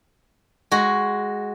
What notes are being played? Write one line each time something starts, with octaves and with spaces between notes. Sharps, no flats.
G#3 F#4